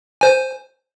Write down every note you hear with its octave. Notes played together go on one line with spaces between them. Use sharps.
C5 G#5